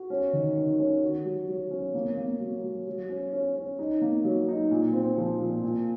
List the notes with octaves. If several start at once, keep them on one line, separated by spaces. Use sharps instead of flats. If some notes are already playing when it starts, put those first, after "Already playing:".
Already playing: F#4
C#4
D#3
D#3
C#4
F#4
F#3
F#3
C#4
A#3
A#3
F#3
F#3
F#3
C#4
C#4
C#4
D#4
A#3
F#3
D#4
A#2
C4
F3
A#2
A#2